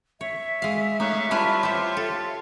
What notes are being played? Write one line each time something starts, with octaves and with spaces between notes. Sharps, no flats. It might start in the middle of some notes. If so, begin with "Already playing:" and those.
C#5 E5
G#3 F5
A3 D#4 C#5 F5 C#6 F#6
G3 E4 F4 B4 C#5 A5 F6
G4 C5
A4